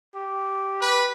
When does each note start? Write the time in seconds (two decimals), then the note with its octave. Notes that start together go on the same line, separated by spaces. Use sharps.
0.14 G4
0.80 B4